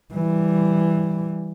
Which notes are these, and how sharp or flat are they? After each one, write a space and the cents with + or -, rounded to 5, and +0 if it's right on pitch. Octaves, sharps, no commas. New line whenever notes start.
E3 +0 G3 +0